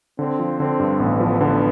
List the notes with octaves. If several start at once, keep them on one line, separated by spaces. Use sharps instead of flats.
D3 C4
F3
D3 C4
G2
A1 B3
F3
D3 B3